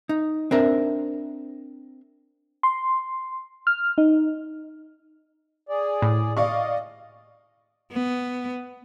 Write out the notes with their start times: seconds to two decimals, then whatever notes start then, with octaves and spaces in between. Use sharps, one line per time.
0.09 D#4
0.51 C4 D4 A#4 E5
2.63 C6
3.67 F6
3.98 D#4
5.69 G#4 D5
6.02 A2
6.37 D5 D#5 F5 C#6
7.92 B3